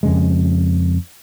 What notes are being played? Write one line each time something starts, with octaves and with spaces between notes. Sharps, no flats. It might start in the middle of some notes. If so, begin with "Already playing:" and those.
F2 C#3 G#3